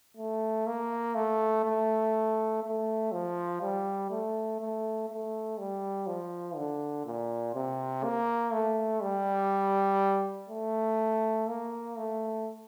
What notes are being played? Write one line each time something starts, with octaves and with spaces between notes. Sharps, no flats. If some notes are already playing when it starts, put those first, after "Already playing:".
A3
A#3
A3
A3
A3
F3
G3
A3
A3
A3
G3
F3
D3
A#2
C3
A#3
A3
G3
A3
A#3
A3